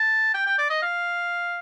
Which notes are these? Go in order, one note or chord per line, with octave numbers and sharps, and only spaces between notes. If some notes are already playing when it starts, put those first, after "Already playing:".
Already playing: A5
G5
G5
D5
D#5
F5